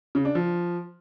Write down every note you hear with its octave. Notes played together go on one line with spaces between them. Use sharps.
C#3
D4
F3